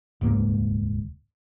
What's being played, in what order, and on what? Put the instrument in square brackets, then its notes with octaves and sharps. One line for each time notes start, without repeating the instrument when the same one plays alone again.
[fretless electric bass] D#1 C#2 G#2 A#3